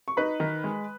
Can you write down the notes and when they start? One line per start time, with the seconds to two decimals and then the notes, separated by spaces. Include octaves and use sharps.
0.08 C#6
0.17 D#4 B4 B5
0.40 D#3
0.64 G#3